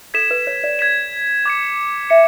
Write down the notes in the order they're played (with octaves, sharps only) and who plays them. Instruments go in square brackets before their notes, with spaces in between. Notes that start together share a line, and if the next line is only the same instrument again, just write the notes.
[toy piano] A4 [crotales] G#6 B6 E7
[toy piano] B4
C#5
D5
[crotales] G#6 B6 E7
D6 G#6 C#7
[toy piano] E5 [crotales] C#7